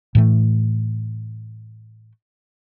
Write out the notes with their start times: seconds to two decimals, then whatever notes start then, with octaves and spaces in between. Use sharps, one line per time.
0.15 A2 E3 A3